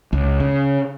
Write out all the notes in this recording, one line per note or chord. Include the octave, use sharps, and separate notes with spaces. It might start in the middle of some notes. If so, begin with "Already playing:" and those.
C#2
C#3